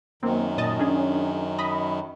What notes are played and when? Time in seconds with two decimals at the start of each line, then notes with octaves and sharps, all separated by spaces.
0.23 F#2 D#3 A#3 C4
0.58 A#2 D#5 A5
0.79 C#4 D4 G#4
1.58 D#5 B5